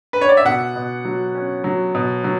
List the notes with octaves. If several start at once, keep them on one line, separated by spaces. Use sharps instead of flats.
B4
C#5
D5
E5
B2 F#5
B2
F#3
C#4
F#3
B2
F#3